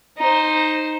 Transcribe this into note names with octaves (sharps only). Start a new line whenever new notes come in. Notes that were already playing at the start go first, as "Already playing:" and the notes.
D#4 C5